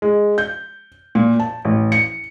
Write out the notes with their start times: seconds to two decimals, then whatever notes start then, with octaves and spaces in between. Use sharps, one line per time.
0.02 G#3
0.38 G6
1.15 A#2
1.40 A5
1.65 A1
1.92 C#7